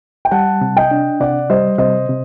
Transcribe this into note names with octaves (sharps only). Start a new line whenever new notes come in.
G5
G3 F#5 A5
C3
D#5 G5
D4
C3 D5 F#5
G3 C5 D#5
C3 C5 D#5
C3